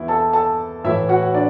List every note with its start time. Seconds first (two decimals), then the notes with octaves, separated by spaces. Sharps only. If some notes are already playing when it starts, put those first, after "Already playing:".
Already playing: E2 E3 E4
0.08 A4 A5
0.33 A4 A5
0.84 A2 E3 E4 E5
1.09 F#4 F#5
1.34 D4 D5